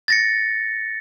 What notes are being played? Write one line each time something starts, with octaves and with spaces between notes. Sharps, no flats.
A6 A#6 C#7